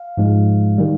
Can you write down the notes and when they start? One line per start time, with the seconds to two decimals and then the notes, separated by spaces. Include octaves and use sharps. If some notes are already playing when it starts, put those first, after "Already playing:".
Already playing: F5
0.17 G#2 F3 G#3
0.78 D#3 G3